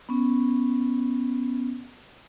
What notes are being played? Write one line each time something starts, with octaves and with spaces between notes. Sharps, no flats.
B3 C#4